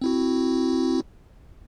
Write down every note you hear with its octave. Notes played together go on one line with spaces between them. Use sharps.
C4 E4 F#4